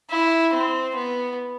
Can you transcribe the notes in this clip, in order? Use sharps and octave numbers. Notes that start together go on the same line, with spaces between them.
E4
C4
B3